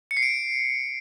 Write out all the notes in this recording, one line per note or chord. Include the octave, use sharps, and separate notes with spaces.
C#7
C7
D7